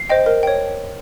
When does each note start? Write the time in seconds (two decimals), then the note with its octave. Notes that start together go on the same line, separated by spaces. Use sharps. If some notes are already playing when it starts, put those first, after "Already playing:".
Already playing: C7
0.09 C5 D#5 G5
0.26 A#4
0.43 C#5 G5